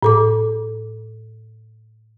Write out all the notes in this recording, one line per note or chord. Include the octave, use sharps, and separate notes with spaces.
A2 A4 D6